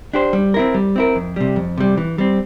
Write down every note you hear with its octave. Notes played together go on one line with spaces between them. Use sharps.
D4 G4 C5
G3
C4 E4 A#4
G3
C4 E4 A#4
F2
C3 G3
F2
C3 G3
E3
G3 C4